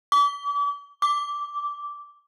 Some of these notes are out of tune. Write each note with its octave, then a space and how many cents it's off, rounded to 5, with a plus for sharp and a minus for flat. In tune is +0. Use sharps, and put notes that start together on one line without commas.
D6 -40
D6 -10